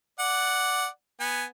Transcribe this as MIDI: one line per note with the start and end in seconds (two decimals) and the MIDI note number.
0.19 0.87 74
0.19 0.87 78
1.20 1.44 59
1.20 1.44 80